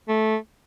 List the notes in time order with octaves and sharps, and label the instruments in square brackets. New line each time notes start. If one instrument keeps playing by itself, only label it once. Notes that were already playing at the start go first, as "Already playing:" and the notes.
[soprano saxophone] A3